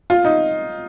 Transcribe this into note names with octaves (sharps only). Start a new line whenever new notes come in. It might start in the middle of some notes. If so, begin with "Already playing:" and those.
F4
D#4